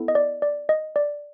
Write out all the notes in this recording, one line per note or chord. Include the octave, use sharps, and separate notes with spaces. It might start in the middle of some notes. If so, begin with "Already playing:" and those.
Already playing: B3 E4 A4
D#5
D5
D5
D#5
D5